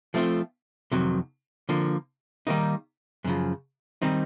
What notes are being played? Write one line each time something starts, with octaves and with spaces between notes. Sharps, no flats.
F3 A3 C4 F4
F2 C3 D#3 F#3
D3 F3 A#3
D#3 G3 A#3 D#4
F#2 C#3 F3
D#3 G3 C4 D#4